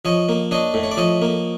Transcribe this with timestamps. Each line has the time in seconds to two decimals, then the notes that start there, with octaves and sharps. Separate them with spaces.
0.05 F3 C#5 D#5
0.29 A#3
0.51 D4 C#5 D#5
0.74 A2
0.83 C#5
0.91 D5
0.97 F3 C#5 D#5
1.22 A#3